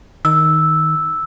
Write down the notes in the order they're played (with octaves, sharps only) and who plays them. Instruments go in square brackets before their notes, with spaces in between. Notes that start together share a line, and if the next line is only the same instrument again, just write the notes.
[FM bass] D#3 [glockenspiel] E6